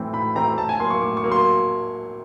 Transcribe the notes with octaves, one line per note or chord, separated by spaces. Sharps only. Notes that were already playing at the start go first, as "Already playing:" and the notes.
Already playing: A2 E3 A3 C4
A2 B5
E3 A3 C4 A#5
A2 A5
G#5
F#3 A#3 C6
C#6
A2 D6
C#6
F#3 A#3
C6